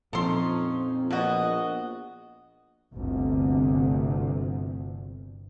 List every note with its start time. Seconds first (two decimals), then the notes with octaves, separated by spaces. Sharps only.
0.13 F2 A#2 F3 C#4 D#4 A4 C6
1.11 A#1 B2 B3 F#4 D#5
2.94 G1 D2 C3